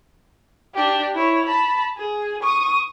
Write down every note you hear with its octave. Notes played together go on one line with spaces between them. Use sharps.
D4 G4
E4 C#5
A5 B5
G#4
C#6 D#6